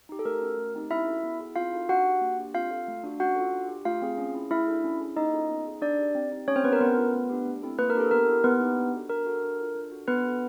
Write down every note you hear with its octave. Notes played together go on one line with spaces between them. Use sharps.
D#4 G4
A4
A3 A#4
C#4 F#4
A3
C4 D#4 G4
C#4 E4 E5
F#4 A4
B3
E4 G#4
C4 F4 F5
D#4 F#4 A4
D4 F#4 F#5
G4
A#3
D4 G4
C4 F4 F5
F4 A4
A3
D4 F#4
C#4 F#4 F#5
F4 A4
D4
G4
A3 F4 F5
C4 F4 G#4
C#4
E4 G#4
A3 E4 E5
D4 F#4 A4
C#4
E4 G#4
A#3 D#4 D#5
C#4 F4 A4
B3
D#4 G#4
D4 D5
G4
C4
D#4 G4
A3 C#4 C#5
C4 C5
B3 D4 G4 B4
A#4
B3 C#4 B4
F4 A4
A3
D4 G4
A3
C4 E4 A4
A#3 B4
A#4
D4 G4 A4
B3 A#4
E4 G4
A#3 B3 B4
D#4 G4
D4
F#4 A4
D4 A#4
F#4 A4
D4
F4 A4
D4
F#4 A4
B3 D4 B4
F#4 A4